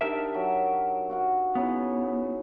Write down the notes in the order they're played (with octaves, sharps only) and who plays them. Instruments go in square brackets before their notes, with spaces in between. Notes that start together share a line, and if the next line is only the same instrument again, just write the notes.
[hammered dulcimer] D4 D#4 G4 [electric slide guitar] A#4 E5
[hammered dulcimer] F#3
F#4 F5 F#5
[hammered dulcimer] C#3 D#4 E4 [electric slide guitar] B3